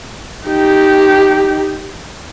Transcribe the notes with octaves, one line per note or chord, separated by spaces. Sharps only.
D#4 G4